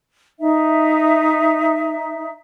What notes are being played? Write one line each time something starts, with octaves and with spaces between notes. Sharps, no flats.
D#4 E5